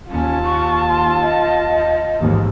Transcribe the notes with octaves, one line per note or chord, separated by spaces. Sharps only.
D#2 C#4 F4 A5
C#6
C6
D#5
A1 D#2 G#2